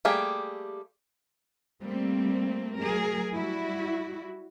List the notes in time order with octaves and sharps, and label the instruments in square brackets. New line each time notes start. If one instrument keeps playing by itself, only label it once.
[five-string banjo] G3 A3 A#3 G4 G#4
[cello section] G3 A3 A#3 C4
F#3 A3 G#4 A#4
G3 E4 F#4